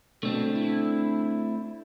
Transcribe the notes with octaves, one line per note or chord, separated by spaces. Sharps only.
B2 D3 A3 C4 D4
E4